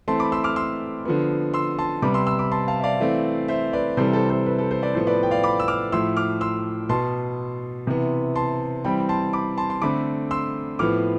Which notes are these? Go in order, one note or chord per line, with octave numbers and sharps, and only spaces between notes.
E3 A3 C4 A5 C6
B5 D6
C6 E6
D6 F6
C6 E6
D3 F3 B3
C6 E6
A5 C6
C3 G3 B3 B5 D6
C6 E6
C6 E6
B5 D6
A5 C6
F5 A5
E5
D5 F5
E3 A3 C4
C5 E5
B4 D5
C3 E3 G3 C4 A4 C5
A4 C5
A4 C5
B4
A4
A4 C5
B4 D5
A2 F3 B3 A4 C5
B4 D5
G5
D5 F5
B5 D6
E6
D6 F6
A2 F3 A3 C6 E6
D6 F6
C6 E6
B2 B3 A5 C6
C3 E3 B3
A5 C6
E3 G3 C4 G5 B5
A5 C6
B5 D6
A5 C6
C6
D3 A3 C4 B5 D6
C6 E6
A2 F3 B3 D6 F6